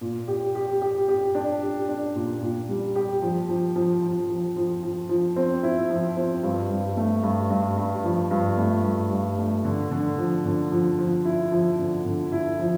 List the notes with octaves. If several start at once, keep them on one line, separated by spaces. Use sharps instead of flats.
A#2
G4
G4
G4
G4
D4
G4
D4
A#2
A#2
G3
G4
F3
F3
F3
F3
F3
F3
F3
F3
C4
E4
F3
C4
G2
G2
A3
G2
G2
G2
F3
G2
A3
G2
G2
A3
D3
D3
F3
D3
F3
F3
E4
F3
D3
D3
E4
F3